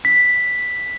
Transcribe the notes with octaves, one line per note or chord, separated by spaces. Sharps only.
B6